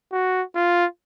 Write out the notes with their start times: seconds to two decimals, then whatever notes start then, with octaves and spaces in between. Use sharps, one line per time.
0.12 F#4
0.55 F4